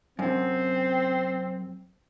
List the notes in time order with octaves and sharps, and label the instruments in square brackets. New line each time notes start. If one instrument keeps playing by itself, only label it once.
[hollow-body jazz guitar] F#2 C3 [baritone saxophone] C4